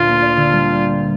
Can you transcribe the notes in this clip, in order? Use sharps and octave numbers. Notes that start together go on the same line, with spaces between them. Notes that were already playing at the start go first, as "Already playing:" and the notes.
Already playing: D2 A#2 D4 F4
A#3
D5
D3
G3